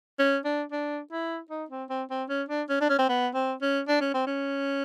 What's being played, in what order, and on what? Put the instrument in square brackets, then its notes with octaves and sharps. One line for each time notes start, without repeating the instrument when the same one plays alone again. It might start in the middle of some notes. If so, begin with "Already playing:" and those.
[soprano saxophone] C#4
D4
D4
E4
D#4
C4
C4
C4
C#4
D4
C#4
D4
C#4
C4
B3
C4
C#4
D4
C#4
C4
C#4